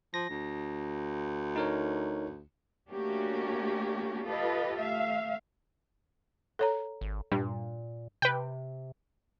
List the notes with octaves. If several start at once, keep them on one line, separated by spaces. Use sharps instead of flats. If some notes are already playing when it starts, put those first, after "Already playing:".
F3 A#6
D2
D#4 A#4 C#5
A3 A#3 C#4 D4 F#4 G4
F4 G4 A4 B4 D#5
A3 E5 F5
A4 C#5 A#5
G#1
G2 A#2
C3 B4 G5